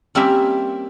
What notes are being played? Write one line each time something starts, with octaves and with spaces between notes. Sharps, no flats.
G3 A#3 C4 C#4 A#4 E5